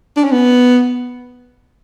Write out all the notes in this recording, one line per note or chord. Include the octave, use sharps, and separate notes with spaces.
D4
C#4
B3